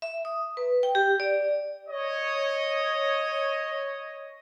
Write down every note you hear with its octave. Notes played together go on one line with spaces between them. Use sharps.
E5
D#6
B4
G5
G4
D5
C#5 D#5